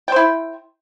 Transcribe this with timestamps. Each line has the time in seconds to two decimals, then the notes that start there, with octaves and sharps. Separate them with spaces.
0.08 G5
0.12 C5
0.16 E4